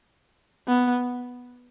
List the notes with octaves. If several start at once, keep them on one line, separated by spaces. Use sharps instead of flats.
B3